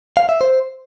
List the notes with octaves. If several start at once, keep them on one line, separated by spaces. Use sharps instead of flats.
F5
E5
C5